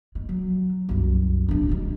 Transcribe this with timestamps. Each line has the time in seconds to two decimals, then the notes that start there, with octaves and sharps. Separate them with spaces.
0.15 G#3
0.29 F#3
0.89 C2 F#2
1.49 D1 D4
1.69 G3 G#3